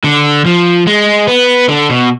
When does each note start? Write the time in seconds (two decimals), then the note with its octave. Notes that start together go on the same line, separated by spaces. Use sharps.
0.04 D3
0.46 F3
0.87 G#3
1.28 B3
1.69 D3
1.90 B2